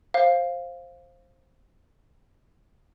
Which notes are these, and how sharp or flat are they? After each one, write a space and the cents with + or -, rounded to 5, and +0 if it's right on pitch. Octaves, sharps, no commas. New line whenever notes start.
C5 +15 F5 +0